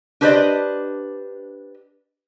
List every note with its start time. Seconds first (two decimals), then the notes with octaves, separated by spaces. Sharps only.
0.21 D4 G4 B4 C5 D5 D#5